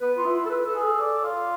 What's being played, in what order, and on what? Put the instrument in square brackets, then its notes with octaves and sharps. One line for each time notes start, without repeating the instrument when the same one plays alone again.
[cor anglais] B3 [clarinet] B4
[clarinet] F4
[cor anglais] E4
[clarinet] F4
A4
B4
A4
[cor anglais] G#4
[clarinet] A4
[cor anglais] D5
F4